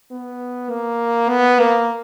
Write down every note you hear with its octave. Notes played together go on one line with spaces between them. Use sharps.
B3
A#3
B3
A#3